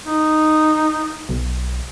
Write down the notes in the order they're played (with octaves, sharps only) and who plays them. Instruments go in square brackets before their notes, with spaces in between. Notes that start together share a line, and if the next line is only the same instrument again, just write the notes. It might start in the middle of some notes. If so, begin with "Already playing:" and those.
[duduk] D#4
[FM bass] B1